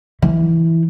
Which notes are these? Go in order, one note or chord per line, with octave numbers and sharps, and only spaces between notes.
E3